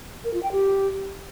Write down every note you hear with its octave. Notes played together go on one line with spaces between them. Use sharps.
A#4
F4
G5
G4